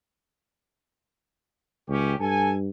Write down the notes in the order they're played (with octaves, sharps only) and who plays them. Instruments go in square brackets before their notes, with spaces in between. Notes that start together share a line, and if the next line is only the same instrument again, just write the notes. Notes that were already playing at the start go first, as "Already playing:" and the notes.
[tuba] C#2 [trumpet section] C#4 G4
[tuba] G2 [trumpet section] A4 G#5